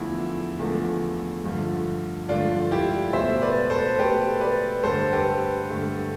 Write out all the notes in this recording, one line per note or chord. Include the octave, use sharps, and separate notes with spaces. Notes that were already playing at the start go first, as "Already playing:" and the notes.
Already playing: E2 D3 F3 A3 E4
E2 D3 F3 A3
G2 D3 F3 A3
G2 D3 F3 A3 D4 F4
E4 G4
B2 A3 C5 E5
B4 D5
A4 C5
B2 A3 G4 B4
B4 D5
G2 D3 A3 A4 C5
G4 B4
G2 D3 A3